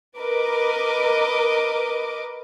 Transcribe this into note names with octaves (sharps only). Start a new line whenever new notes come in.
A#4 B4 D#5 D6